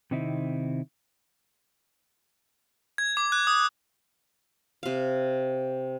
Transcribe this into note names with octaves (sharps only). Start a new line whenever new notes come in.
C3 D#3 C4 D#4 E4
G#6
D6
F#6
D#6
C3 F5